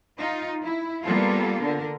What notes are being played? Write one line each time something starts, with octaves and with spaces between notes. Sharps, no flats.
D#4 F4
E4
G3 A#3 B3 F4 A4
D3 A#4